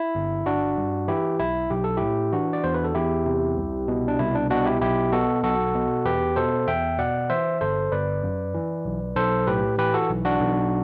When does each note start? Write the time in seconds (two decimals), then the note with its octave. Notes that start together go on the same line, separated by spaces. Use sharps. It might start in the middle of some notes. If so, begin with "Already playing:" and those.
Already playing: E4
0.15 G1
0.46 G1 D4 F#4
0.77 G2
1.08 E3 E4 G4
1.40 B1 E4
1.70 B1 G4
1.84 A4
1.97 A2 E4 G4
2.33 E3 D4 F#4
2.53 D5
2.64 E2 C5
2.74 B4
2.84 A4
2.95 E2 E4 G4
3.26 C3
3.57 C2
3.88 B2
4.08 D4
4.19 C2 E4
4.35 D4
4.50 B2 D4 F#4
4.66 E4 G4
4.81 B1 E4 G4
5.12 B2 F#4 A4
5.43 B1 F#4 A4
5.74 B2
6.05 E2 G4 B4
6.36 B2 A4 C5
6.68 E2 E5 G5
6.99 B2 D5 F#5
7.30 E3 C5 E5
7.61 G1 A4 C5
7.92 G1 B4 D5
8.23 F#2
8.54 E3
8.85 B1
9.16 B1 A4 C5
9.47 A2 G4 B4
9.78 E3 G4 B4
9.94 F#4 A4
10.10 B1
10.25 D4 F#4
10.41 B1